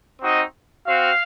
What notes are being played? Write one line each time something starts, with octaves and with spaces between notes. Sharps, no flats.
C4 D#4 F#4 D#5
C4 F#4 F5